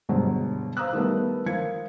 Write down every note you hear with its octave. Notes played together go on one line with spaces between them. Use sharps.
G1 G2 B2 F#3 G#3 C5
C5 F5 A#5 D#6 E6 F#6
D#3 G3 A3 B3
F3 A#4 G#6 C#7